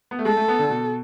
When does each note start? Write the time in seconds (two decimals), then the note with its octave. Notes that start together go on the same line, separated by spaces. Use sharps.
0.11 B3
0.19 A3
0.25 G#3 A4
0.37 A3
0.48 B3
0.59 D3
0.70 B2